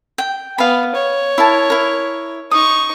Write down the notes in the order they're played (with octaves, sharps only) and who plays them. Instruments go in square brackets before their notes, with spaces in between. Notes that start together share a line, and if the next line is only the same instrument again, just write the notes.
[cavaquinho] G5
[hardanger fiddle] B3 [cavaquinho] F5 B5
[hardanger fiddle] C#5
[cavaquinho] E4 A#4 A5
E4 A#4
[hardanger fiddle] D#4 C#6 [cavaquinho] D#6